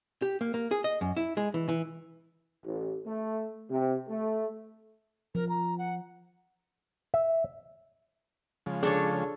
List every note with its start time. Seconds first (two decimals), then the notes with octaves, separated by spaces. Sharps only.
0.22 G4
0.41 A#3
0.54 A#3
0.71 G#4
0.84 D#5
1.01 F#2
1.17 E4
1.37 G#3
1.54 E3
1.69 E3
2.65 A1
3.06 A3
3.70 C3
4.09 A3
5.35 F3 A#4
5.49 A#5
5.78 F#5
7.14 E5
8.66 C#3 F3 G#3
8.83 D4 G#4 A4 C#5